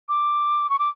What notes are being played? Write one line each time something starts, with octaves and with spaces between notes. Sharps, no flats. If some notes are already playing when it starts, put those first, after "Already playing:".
D6
C#6
D6